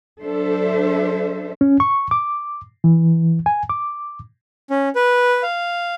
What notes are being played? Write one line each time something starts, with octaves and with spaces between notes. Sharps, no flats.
F#3 D4 A4 C5 E5
C#4
C#6
D6
E3
G#5
D6
C#4
B4
F5